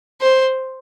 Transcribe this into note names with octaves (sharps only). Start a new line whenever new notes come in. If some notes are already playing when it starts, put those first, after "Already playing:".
C5